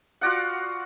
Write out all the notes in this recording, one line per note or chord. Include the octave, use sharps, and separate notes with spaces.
F4 F#4 D5 F#5